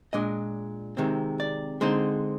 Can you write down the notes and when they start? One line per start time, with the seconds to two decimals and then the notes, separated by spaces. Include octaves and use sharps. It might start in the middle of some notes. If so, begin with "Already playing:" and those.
0.13 A#2 G#3 D4 D#5
0.97 C3 D#3 G#3 C4
1.40 D5
1.81 D3 G#3 C4 D#4 C5